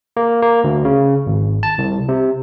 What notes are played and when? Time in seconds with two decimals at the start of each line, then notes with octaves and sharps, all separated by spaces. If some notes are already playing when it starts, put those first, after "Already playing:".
0.17 A#3
0.42 A#3
0.64 D2
0.85 C#3
1.26 G#1
1.63 A5
1.78 C2
2.08 C3